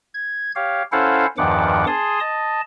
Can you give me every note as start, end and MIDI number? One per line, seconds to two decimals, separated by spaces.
0.14 0.52 92
0.55 0.83 67
0.55 0.83 73
0.55 0.83 77
0.92 1.26 61
0.92 1.26 64
0.92 1.26 69
0.92 1.26 72
0.92 1.26 77
0.92 1.26 78
1.38 1.85 40
1.38 1.85 43
1.38 1.85 51
1.38 1.85 53
1.38 1.85 78
1.38 1.85 86
1.87 2.20 68
1.87 2.20 81
1.87 2.20 84
1.87 2.20 87
2.20 2.61 75
2.20 2.61 81